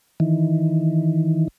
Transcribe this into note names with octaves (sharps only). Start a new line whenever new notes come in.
D#3 E3